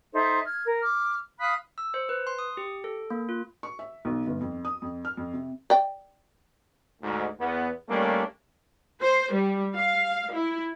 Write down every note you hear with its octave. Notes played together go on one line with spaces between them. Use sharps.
D#4 A4 C5 E5
F6 G#6
A#4
D6 F6
F5 B5 D#6 F#6
E6
C5
B4
C6
D#6
G4
A4
A#3
F4
C#6
E5
B1
G1
F2
D#6
F2
F6
F2
C3
D5 G5
D2 G#2
E2 B3
D#2 G3 A3 A#3 C#4 D4
C5
G3
F5
E4